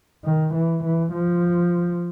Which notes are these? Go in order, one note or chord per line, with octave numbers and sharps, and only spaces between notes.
D#3
E3
E3
F3